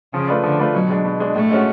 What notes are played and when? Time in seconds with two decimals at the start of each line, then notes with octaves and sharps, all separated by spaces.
0.14 C#3 F3
0.28 A3 F4 B4 D5
0.44 D3 F3
0.59 A3 F4 B4 D5
0.74 B2 F#3
0.90 G#3 D4
1.05 B2
1.20 G#3 D4
1.35 A2 A3
1.51 G#3 C#4 F#4